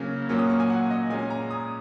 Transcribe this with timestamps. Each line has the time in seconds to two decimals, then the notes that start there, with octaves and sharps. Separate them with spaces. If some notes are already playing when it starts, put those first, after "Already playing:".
Already playing: C#3 F#3 A#3 C#4
0.29 A#2 F#3 A#3 C#4
0.39 D#6
0.50 C#6
0.60 G#5
0.70 F#5
0.91 D#5
1.10 A#2 G#3 C#4 G#5
1.30 A#5
1.51 D#6